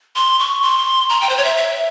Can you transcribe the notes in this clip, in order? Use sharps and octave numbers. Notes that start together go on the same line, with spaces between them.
C6
C#6
C6
A#5
G5
C5
C#5
E5
E5